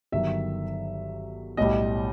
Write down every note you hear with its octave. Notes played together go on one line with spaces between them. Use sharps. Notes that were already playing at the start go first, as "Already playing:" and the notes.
G1 G2 D#3 F#3 E5
B1 A2 G3 D#5